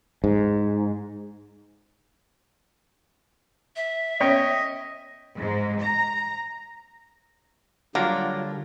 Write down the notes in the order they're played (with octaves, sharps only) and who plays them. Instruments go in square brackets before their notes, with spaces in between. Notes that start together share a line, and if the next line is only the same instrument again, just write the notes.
[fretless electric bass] G#2
[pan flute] E5
[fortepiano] C#4 C#5 G5 [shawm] D#5
[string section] G#2
A#5
[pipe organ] D3 G3 [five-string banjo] F#3 [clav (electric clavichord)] A#3 D4 A#4 [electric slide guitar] F4